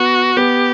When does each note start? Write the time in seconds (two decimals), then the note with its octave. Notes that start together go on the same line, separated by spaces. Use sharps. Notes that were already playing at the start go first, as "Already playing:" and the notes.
Already playing: B3 F#4
0.37 B3 G4